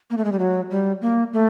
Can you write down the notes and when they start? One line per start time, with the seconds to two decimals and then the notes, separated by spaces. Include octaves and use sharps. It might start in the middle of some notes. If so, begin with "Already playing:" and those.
0.10 A#3
0.17 A3
0.25 G#3
0.32 G3
0.39 F#3
0.70 G3
1.02 A#3
1.33 A3